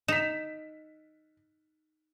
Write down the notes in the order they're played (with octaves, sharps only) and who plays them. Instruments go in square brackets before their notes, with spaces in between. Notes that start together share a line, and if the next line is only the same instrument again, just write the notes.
[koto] D#4 [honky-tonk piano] B6 E7